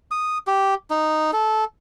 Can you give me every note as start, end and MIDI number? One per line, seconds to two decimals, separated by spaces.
0.11 0.38 87
0.47 0.74 67
0.90 1.31 63
1.33 1.64 69